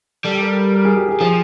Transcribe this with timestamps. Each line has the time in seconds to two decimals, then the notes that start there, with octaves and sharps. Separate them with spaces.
0.24 G3 A4
0.41 A#4
0.57 A#4
0.73 A#4
0.85 G#4
0.97 G4
1.09 G#4
1.20 F3 G#4